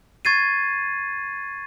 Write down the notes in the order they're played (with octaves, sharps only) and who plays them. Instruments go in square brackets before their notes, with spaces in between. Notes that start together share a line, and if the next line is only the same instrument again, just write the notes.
[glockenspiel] C#6 G#6 A6 C7 D#7